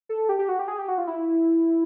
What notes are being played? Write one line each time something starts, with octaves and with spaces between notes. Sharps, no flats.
A4
G4
G4
F#4
G4
G#4
G4
F#4
F4
E4